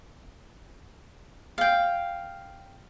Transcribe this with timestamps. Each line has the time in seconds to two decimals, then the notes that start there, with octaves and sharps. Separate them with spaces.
1.58 F5 G5